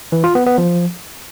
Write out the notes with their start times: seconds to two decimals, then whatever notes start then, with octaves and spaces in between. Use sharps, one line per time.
0.12 E3
0.24 F4
0.35 B3
0.47 B3
0.58 F3